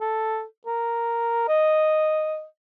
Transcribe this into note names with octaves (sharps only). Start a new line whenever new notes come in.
A4
A#4
D#5